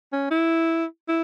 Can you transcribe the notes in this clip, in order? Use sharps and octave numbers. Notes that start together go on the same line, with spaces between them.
C#4
E4
E4